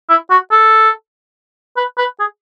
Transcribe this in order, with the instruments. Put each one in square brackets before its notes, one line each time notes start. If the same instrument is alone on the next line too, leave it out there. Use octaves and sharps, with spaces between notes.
[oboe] E4
F#4
A4
B4
B4
G#4